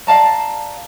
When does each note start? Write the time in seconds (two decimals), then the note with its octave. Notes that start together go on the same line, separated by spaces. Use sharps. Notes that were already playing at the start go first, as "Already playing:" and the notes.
0.07 D5 F5 A5 A#5